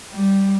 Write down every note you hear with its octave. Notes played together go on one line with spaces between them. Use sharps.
G3